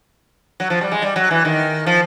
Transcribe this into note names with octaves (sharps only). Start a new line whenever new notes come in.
F#3
F3
G3
G#3
G3
F#3
E3
D#3
F3